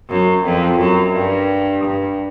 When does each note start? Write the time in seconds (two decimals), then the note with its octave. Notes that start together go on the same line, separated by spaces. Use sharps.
0.10 F#2
0.45 F2
0.79 F#2
1.14 G2
1.84 G2